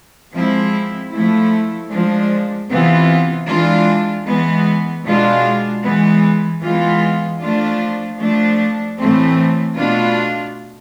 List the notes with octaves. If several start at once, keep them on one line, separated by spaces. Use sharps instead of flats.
F3 G#3 C4 E4
F3 A3 E4
F3 G#3 D4
C3 E3 B3 F4
E3 G#3 D4 F4
E3 G#3 B3
B2 G#3 D4 F4
E3 G#3 B3
E3 G#3 B3 F4
F3 A3 D4 F4
F3 A3 D4
A2 E3 A3 C4
B2 A3 D4 F4